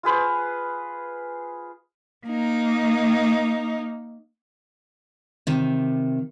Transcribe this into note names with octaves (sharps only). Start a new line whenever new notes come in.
F4 G#4 B4 C5
A#3 D#4
C3 D#3